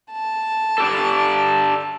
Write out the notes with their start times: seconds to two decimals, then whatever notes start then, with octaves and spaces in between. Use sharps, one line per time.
0.13 A5
0.78 D4 G4 A4